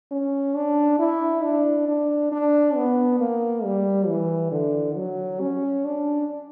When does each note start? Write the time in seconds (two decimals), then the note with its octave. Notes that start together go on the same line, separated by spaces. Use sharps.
0.11 C#4
0.56 D4
0.99 E4
1.44 D4
1.88 D4
2.32 D4
2.76 B3
3.20 A#3
3.64 G3
4.08 E3
4.52 D3
4.96 F#3
5.41 C#4
5.85 D4